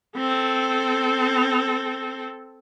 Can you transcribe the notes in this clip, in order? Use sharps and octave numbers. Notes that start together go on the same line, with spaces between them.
C4 A4